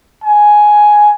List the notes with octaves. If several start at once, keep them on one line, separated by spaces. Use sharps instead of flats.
G#5